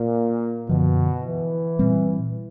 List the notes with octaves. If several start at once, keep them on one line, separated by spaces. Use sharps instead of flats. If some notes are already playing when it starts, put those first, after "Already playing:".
Already playing: A#2
F#2 B2 D3 F3
E3
A#2 G3 C4